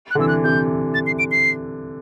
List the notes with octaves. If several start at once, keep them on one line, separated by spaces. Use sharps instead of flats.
F#6
D3
C3 E3 E6
F#6
C3 E3 G6
A6
C7
D7
C7